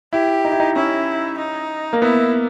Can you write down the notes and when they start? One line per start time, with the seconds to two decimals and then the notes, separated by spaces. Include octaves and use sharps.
0.13 E4 G4
0.45 D#4
0.52 E4
0.60 D#4
0.76 C#4 E4
1.39 D#4
1.93 A#3
2.02 B3 E4